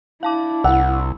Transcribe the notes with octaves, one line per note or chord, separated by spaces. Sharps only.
D4 E4 F5 A5 D6
C2 F#5 E6